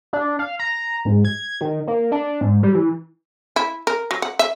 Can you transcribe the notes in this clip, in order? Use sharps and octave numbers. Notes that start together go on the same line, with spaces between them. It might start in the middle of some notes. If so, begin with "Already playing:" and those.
D4
F5
A#5
G#2
G#6
D#3
A#3
D4
G#2
G3
E3
E4
A#4
F#3
F#5
E5